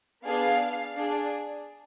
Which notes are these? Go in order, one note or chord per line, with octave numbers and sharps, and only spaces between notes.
B3 D4 G#4 F5
D4 G#4